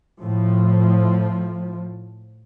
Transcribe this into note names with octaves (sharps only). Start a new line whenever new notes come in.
A2 F3